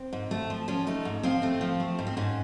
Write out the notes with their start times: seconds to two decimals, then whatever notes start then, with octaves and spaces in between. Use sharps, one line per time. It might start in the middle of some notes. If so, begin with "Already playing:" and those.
Already playing: C4
0.13 G#2
0.31 A3
0.50 F3
0.68 F3 C#4
0.87 A3 D#4
1.05 G#2
1.23 F3 C4
1.42 A3 C4
1.61 F3
1.80 A3
1.99 G#2
2.07 C4
2.17 G#2 C#4